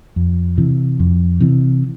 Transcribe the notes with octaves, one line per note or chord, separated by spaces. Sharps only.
F2
C3 E3
F2
C3 E3